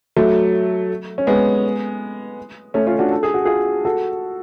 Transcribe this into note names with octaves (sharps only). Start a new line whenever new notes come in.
F#3 A3
C#4
G#3 B3
A3 C#4
C#4 F4
D4 F#4
A4
G#4
F#4
F4 G#4
F#4 A4